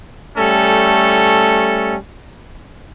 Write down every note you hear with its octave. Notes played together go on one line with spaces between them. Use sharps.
G3 A3 C#4 A4